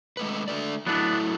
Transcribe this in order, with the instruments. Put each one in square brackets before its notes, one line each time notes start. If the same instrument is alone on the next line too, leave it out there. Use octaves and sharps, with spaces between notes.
[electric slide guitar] G#3 A3 B4
D3 A3 D5
[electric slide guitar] F#3 A3 E4 [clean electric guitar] B3 D4